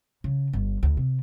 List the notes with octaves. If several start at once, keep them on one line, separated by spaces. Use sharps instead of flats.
C#3
G1
D2
C3